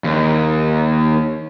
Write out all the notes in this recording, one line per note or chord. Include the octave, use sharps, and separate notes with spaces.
D#2